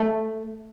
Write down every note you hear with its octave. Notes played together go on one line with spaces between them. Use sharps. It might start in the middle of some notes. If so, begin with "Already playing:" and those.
Already playing: A3